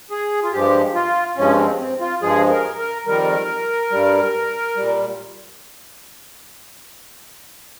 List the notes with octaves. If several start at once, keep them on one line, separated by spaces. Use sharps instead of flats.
G#4
F4
G2 F3 G#3 G4
F4
G2 F3 G#3 C#4
C4
C4
F4
G2 F3 G#3 G#4
A#4
A#4
F2 D#3 G3 A#4
G2 G3
A#2 G3